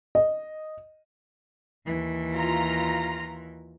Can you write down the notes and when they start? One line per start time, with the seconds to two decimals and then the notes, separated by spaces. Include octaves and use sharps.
0.15 D#5
1.86 D#2 E3
2.32 F4 A#5